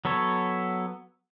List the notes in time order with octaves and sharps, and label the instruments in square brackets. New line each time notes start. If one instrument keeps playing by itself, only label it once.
[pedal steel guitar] F#3 B3 A4 C#5